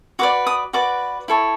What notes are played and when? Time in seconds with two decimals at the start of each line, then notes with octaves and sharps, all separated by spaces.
0.19 F#4 B4 D5 D6
0.47 D#6
0.73 F#4 B4 D5 D6
1.28 E4 A4 C#5